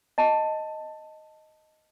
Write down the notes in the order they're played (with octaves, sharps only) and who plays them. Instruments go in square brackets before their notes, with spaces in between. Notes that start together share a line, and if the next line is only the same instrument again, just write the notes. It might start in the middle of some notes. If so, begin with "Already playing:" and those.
[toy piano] D#5 A5